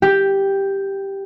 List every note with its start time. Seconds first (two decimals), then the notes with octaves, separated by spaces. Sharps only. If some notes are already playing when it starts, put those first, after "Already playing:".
0.02 G4